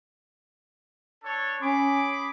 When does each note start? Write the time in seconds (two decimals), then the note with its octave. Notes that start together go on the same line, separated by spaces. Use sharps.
1.24 D4 A4 C#5
1.62 C#4 G#4 B5 D6